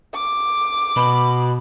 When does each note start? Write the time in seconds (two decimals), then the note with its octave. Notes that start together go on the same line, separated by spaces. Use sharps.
0.15 D6
0.96 B2 B5